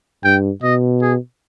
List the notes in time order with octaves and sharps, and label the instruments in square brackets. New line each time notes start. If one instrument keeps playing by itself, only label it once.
[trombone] G2 [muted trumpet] G5
[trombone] B2 [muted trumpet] D#5
[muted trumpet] G#4